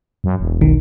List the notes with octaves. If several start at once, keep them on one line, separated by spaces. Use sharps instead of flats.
F#2
E1
B1 D#3